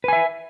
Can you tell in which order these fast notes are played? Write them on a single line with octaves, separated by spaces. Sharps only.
B4 G#5 E5